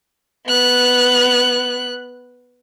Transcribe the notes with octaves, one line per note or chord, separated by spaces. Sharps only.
B3 F#6